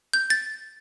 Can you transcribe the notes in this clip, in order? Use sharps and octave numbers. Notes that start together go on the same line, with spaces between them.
G6
A6